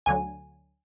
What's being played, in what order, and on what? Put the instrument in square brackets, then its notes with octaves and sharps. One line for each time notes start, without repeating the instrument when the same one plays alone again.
[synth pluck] D2 D3 F#3 G#5